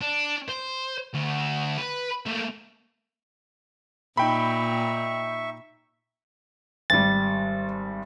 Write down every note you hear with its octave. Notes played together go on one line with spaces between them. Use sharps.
D4
C5
D2
B4
A3 A#3
A#2 D#4 E5 G5 B5 C#6
G#1 G3 A6